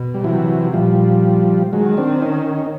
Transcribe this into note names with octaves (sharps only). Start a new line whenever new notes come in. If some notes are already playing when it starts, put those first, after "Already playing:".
Already playing: B2
G3
C3 E3 F#3
A#2 F3 G3
D#3 F#3 G#3
C4 D4
C#4 D#4